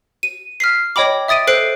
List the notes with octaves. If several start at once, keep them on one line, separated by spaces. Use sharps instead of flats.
D#7
F6 B6 C7
C#5 D#5 G5 B5 D6
E5 D#6 A6 D7 D#7
A4 C5 F#6 C7 D7